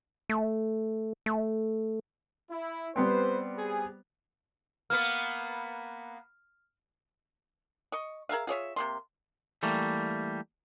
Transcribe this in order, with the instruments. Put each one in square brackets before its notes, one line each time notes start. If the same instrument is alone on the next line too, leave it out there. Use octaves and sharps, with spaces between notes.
[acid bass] A3
A3
[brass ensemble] E4
[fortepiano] G3 B3 C4 [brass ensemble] B4 C5
[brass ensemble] G#4
[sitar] A#3 B3 [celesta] F6
[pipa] D#5 C#6
G#4 A#4 E5 F5
F4 G#4 C#5 E5
C3 A#3 C6
[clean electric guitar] E3 G3 A3 A#3